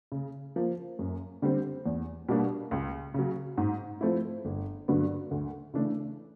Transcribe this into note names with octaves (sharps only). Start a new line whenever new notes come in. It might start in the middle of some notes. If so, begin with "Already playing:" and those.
C#3
F3 A#3
F#2
D3 G3 C4
E2
B2 G3 A#3 D4
C#2
C#3 F#3
G#2
F3 A3 C4 E4
G1
G2 D3 F#3 B3
D2
C#3 E3 A3 D4